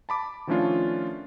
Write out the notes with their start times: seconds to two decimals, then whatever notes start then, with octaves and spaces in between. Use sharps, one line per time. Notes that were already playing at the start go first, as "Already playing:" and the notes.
0.09 A5 B5 D6
0.47 D#3 F3 A3 C#4 D4 F4